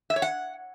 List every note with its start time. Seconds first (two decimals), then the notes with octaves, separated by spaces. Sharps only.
0.10 E5
0.16 C#5
0.22 F#5